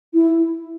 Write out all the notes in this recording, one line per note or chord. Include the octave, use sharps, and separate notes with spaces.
E4